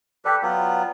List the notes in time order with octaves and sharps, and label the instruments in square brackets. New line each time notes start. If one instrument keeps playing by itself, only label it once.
[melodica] G4 A4 B4 [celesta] D5 G5 G6
[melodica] F#3 B3 F4